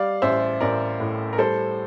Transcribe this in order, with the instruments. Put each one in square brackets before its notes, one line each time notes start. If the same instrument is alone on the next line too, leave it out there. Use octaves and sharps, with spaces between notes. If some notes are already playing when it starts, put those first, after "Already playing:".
Already playing: [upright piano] G3 D5 F5
A1 C5 E5
A1 A#4 D5
A2
A#4
G3 A4 C5